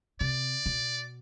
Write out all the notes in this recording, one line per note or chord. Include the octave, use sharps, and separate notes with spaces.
C3 D5
B2